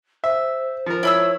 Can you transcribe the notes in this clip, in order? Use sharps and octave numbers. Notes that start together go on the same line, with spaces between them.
C5 E5
F3 A#4
E4 C#5 B5 E6